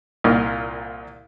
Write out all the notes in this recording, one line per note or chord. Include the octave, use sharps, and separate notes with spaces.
C2 A#2 D#5 F6